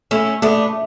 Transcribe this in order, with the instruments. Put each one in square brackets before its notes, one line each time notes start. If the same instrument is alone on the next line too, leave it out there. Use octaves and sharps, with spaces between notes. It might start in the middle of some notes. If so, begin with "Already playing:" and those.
[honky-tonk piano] A3 [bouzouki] C#4 E4
[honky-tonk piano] A3 [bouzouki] B3 D4